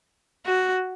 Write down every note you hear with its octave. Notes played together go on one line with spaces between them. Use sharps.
F#4